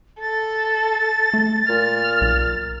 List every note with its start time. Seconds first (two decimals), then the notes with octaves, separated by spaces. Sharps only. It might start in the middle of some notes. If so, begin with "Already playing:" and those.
0.21 A4 A6
1.34 A3
1.69 A#2 F6
2.21 B1